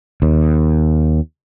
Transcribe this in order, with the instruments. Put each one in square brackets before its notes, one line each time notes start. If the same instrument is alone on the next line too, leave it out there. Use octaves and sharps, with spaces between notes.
[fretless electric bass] D#2